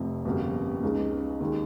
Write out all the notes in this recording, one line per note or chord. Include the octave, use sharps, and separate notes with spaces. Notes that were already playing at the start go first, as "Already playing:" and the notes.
Already playing: F1 F2 C3 F3
G1 F2 C#3 G3 A#3
C#2 C#3 G#3 D#4
D#2 D#3 G#3 D#4